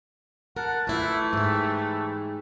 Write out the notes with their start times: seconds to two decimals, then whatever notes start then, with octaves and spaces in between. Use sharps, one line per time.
0.56 A#4 F#5 A5
0.87 F2 E3 A3 E4 F4
1.33 G#2 G4